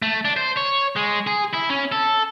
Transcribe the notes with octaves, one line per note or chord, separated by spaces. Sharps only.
A3
D4
C5
C#5
G#3
G#4
E4
C#4
A4